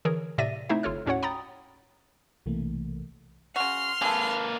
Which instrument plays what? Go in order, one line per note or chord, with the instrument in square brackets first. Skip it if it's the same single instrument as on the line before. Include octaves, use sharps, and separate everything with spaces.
[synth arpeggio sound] D3 E3 G#4 A#4 C#5
A2 C3 D5 E5 A#6 D#7
A3 C4 D#4 E4 C5 E5
G1 F4 A4 C#5 F6
D#2 A2 C#4 F#4 C#5 F#5
G5 A#5 B5 D#6 A6
[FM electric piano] B1 C3 E3 A3 A#3
[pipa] C#3 F#4 [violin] C6 F6
[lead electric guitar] A#3 B4 [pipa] G#4 A4